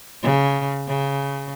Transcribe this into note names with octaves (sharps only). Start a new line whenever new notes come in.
C#3
C#3